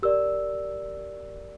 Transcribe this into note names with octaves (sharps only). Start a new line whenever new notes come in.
G4 A#4 D5 E6